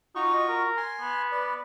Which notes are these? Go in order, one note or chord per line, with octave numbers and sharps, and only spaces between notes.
D#4 F4 F#4 C#6
D#5
A#4
G#5 C6
B3
B4 D5